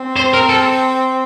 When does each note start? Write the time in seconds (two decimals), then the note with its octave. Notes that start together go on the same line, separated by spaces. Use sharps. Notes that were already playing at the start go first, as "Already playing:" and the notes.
Already playing: C4
0.16 C5
0.34 A#4
0.49 A4